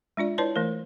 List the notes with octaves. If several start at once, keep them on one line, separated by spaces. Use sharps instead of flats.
G#3 D4 F4 D5
E4 B4 C#5 D5 A5 C6
E3 A3 A#4